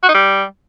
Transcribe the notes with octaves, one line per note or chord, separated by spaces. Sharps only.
F#4
D#4
G3